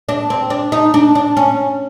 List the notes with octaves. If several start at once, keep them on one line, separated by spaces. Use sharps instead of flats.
D4
C4
D4
D#4
D4
D4
C#4